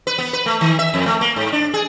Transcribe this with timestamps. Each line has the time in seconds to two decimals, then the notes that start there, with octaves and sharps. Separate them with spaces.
0.07 B4
0.18 B3
0.33 B4
0.46 A3
0.61 D#3
0.79 E5
0.94 F2
1.06 A3
1.21 A#3
1.36 G#2
1.52 D4
1.74 G#4